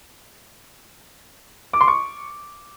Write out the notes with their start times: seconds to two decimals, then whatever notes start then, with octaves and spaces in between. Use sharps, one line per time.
1.73 D6
1.81 C6
1.88 C#6